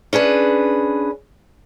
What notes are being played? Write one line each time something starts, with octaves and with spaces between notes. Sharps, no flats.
C#4 D4 G#4 B4